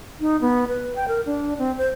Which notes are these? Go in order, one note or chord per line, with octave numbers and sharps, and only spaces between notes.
D#4
B3
B4
G5
A#4
D4
C4
C5